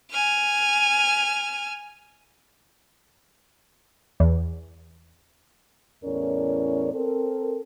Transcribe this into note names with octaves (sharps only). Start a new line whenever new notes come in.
G#5 F6
E2
E2 A2 C#4 A#4 C#5 D5
C4 A4 A#4